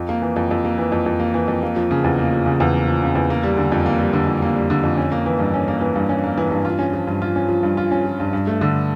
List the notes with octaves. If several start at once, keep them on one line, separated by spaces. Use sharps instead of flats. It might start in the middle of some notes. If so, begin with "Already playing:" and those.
Already playing: F2
A#3
E3
F2
F2
A#3
E3
F2
F2
A#3
E3
F2
A#3
F3
C#3
E2
A#3
F3
C#3
E2
A#3
F3
C#3
E2
A#3
G3
D3
F2
A#3
G3
D3
F2
A#3
G3
D3
F2
C#4
A#3
E3
G2
C#4
A#3
E3
G2
C#4
A#3
E3
G2
F4
C#4
F3
G2
F4
C#4
F3
G2
F4
C#4
F3
G2
G2
A3
D3